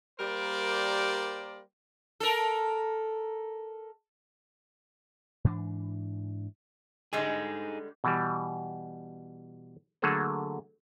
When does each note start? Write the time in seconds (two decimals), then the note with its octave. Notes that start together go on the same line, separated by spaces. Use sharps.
0.20 G3 A#3 G4 A#4 C5 D5
2.20 A4 A#4
5.44 G#2 E3 D4
7.13 D3 G3 G#3 D#4 G#4
8.04 B2 E3 G3
10.02 D3 F#3 A3 A#3 G#4 A4